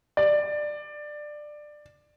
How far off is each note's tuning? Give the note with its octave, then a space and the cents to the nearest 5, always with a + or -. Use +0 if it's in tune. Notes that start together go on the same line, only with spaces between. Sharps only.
D5 +15